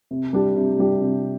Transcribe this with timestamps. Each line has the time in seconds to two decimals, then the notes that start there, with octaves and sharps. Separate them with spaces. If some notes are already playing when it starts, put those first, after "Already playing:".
0.11 C3
0.33 G3 D4 G4
0.56 C3
0.79 G3 D4 G4
1.02 C3